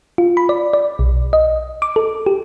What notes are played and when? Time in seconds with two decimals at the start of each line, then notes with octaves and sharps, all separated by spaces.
0.18 F4
0.37 B5
0.49 D5
0.73 D5
0.99 B1
1.33 D#5
1.82 D6
1.96 A4
2.26 G4